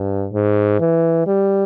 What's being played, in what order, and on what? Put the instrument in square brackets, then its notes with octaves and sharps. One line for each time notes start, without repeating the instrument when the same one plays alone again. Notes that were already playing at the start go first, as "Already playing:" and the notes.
Already playing: [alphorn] G2
G#2
E3
G3